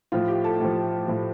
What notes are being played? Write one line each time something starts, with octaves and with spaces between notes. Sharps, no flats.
A2 F3 F4
G4
A4
A2 F3
A2 F3